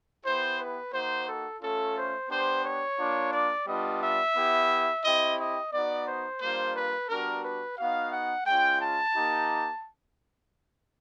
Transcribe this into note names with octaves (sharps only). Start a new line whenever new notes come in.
B3 E4 G4 C5
B4
A#3 D#4 F#4 C5
A4
A3 C#4 F4 A4
C5
B3 D4 G4 C5
C#5
A#3 D4 F4
D5
G3 B3 D4 F4 D#5
E5
B3 E4 G4
C4 E4 G4 D#5
D#5
B3 D#4 F#4 D5
C5
G3 A#3 D4 F4 C5
B4
G3 B3 D4 F#4 A#4
B4
B3 D#4 F#4 F5
F#5
G#3 C#4 F4 G5
A5
A#3 D#4 G4